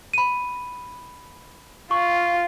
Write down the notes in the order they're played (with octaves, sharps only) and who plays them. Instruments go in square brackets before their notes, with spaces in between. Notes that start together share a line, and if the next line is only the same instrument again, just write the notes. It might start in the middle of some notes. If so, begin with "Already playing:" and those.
[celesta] B5 D#7
[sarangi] F4 [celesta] C#6